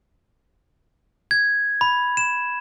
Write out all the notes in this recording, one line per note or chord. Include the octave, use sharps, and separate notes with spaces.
G#6
B5
E7